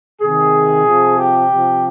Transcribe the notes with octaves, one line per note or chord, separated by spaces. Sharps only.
C3 D#3 G#4
C3 F3
G4
C3 F3